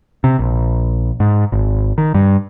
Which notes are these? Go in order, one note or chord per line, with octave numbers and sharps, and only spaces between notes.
C3
A#1
G#2
G#1
D#3
G2